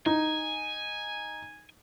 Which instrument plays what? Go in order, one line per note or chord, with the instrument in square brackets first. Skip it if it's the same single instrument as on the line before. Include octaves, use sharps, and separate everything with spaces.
[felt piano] D#4 [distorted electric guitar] G#5